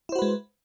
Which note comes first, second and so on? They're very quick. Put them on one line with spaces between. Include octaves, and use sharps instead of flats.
E4 C5 F#4 B4 G#3